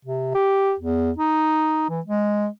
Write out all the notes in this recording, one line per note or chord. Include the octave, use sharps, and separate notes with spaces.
C3
G4
E2
D#4
E3
G#3